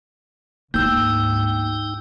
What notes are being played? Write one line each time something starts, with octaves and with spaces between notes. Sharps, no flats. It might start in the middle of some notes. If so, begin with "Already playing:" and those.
D2 G#2 A#3 D#4 G5 E6 G6